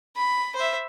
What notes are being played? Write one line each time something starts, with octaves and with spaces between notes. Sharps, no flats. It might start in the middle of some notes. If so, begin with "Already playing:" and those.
B5
C5 E5